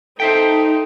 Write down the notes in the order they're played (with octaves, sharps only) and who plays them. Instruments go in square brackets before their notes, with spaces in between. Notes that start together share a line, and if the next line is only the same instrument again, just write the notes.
[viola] D#4 [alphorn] A4 [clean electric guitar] C5 E5 G5